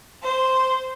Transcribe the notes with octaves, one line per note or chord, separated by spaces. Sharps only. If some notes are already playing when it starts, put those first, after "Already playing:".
C5